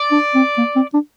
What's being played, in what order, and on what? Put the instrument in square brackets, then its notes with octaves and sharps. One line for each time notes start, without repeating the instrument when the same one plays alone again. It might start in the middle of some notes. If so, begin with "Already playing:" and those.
Already playing: [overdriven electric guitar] D5
[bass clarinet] D4
C4
A#3
C4
D4